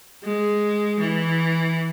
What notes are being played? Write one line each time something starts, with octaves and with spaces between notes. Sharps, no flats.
G#3
E3